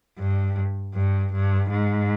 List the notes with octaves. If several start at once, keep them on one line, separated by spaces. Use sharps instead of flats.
G2
G2
G2
G#2